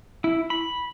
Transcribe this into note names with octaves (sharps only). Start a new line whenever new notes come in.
E4
B5